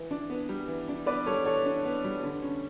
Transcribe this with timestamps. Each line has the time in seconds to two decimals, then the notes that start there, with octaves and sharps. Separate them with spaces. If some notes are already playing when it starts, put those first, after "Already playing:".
Already playing: E3
0.11 D4
0.30 B3
0.49 G3
0.68 E3
0.88 D4
1.06 B3 B4 D5
1.26 G3 A4 C#5
1.45 E3 A4 C#5
1.66 D4
1.85 B3
2.04 G3
2.23 D3
2.42 C#4